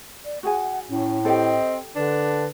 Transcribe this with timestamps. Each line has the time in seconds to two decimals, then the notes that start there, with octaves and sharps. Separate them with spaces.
0.25 D5
0.43 F#4 G#4 F#5 G#5
0.89 A2 C#4
1.25 C4 G4 A4 D#5
1.96 D3 D4 B4